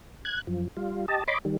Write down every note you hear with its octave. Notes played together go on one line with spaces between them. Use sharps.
F#6 G#6
F#2 F3
G3 F4
G4 D#5 A5
C#5 D#5 B5 C6 D6
D#3 G3